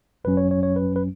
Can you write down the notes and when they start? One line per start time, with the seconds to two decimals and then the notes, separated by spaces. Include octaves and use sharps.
0.24 G#1 F#2 F#3 C#4 B4
0.37 C#5
0.51 C#5
0.63 C#5
0.76 B4
0.96 B4